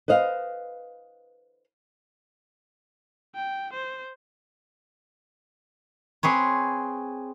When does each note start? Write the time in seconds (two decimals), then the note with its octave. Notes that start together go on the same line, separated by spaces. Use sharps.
0.08 B4 C5 D#5 F5
3.36 G5
3.74 C5
6.23 C4 G#4 B4 C#5